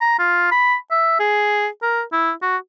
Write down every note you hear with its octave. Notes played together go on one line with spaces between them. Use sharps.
A#5
F4
B5
E5
G#4
A#4
E4
F#4